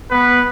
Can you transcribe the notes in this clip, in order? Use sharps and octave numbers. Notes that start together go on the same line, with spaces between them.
B3 B4